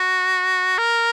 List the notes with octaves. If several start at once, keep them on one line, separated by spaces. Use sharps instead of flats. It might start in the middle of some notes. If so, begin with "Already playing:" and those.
Already playing: F#4
A#4